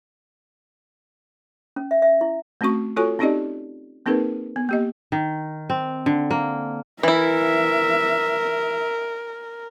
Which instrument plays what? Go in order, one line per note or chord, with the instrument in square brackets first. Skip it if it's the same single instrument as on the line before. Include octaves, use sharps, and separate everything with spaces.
[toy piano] C#4
E5
E5
E4
[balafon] A3 C4 C#4 F#4 C#6
F4 F#4 A4 C#5 G#5 C#6
C4 C#4 D#4 G4 D5 D#5
A#3 C4 D#4 G#4 A#4 B4
B3
A#3 G4 D#5
[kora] D#3
C4
D3
A#3
[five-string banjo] E3 E4 [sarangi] A#4 [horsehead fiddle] E5